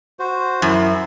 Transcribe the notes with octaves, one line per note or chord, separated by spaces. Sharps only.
F#4 C5
F#2 E4